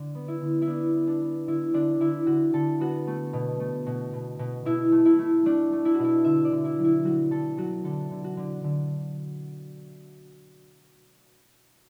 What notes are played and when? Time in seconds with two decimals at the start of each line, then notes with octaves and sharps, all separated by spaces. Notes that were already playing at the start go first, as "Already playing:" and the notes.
Already playing: D3
0.15 B3
0.28 E4
0.42 D3
0.62 E4
0.67 B3 D4
0.94 B3
1.07 D4
1.22 B3
1.47 D3 E4
1.74 D3 D4
2.00 D3 E4
2.27 D3 F#4
2.54 D3 A4
2.80 B3 F#4
3.07 A3
3.33 B2
3.60 A3
3.86 B2
4.13 B2
4.39 B2
4.65 B2 E4
4.92 A3
5.05 E4
5.19 A3
5.46 A3 D4
5.72 A3
5.85 E4
5.94 B2 F#4
6.04 E4
6.25 D3 E5
6.45 D5
6.52 D3
6.64 E4
6.78 F#3
6.84 E4
7.05 F#3 F#4
7.31 D3 A4
7.58 F#3 F#4
7.84 D3 A4
8.11 D3
8.24 F#4
8.37 D3
8.64 D3